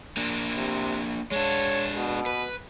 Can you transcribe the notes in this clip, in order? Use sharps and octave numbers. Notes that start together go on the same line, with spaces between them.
A#3 D4
C3
G#3 D4 C#5
B2
B4